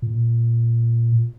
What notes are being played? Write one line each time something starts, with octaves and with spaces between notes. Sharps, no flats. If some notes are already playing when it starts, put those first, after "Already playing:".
A#2